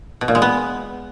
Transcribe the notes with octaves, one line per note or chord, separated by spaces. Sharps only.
B2
A#2
G#3
B3